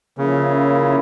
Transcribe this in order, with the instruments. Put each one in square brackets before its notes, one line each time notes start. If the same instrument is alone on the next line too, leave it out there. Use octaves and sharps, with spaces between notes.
[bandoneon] C#3 [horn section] F3 A#3 C#4 E4